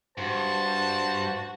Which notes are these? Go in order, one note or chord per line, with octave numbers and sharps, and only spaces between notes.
G2 F#4 C5 A5